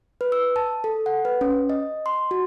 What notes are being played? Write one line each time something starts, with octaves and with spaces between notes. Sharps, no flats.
B4
E6
A5
A4
F#5
B4
C#4
D#5
C6
F#4